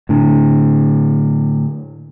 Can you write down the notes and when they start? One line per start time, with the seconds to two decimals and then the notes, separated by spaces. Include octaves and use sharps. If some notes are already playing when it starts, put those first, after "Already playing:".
0.09 A2 D3